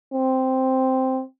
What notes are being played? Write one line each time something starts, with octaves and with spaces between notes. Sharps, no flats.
C4